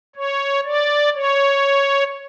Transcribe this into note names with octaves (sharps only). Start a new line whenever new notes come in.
C#5
D5
C#5